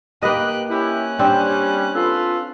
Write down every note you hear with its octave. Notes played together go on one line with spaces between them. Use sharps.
A#3 G4 B4 D#5 F#6
C#4 E4 G4 F#6
G3 C4 D4
F4 A4 B4